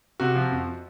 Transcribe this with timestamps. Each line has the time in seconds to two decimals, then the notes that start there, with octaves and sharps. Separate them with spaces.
0.20 C3 F#4
0.35 F3
0.52 F2